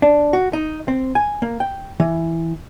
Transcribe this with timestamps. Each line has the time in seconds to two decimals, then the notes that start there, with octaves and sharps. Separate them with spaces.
0.02 D4
0.33 F#4
0.53 D#4
0.88 C4
1.15 G#5
1.42 A#3
1.60 G5
2.00 E3